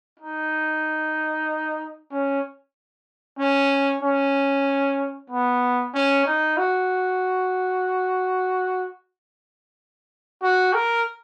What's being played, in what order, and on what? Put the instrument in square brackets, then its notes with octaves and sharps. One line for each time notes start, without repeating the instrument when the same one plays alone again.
[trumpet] D#4
C#4
C#4
C#4
B3
C#4
D#4
F#4
F#4
A#4